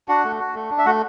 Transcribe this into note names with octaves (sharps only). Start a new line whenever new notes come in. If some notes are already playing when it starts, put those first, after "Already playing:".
D4 F#4 F#5
A3
F#4
A3
D4
E5
A3 F#4 F#5